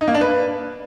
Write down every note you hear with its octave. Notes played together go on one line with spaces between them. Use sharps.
D#4
A#3
D4
B4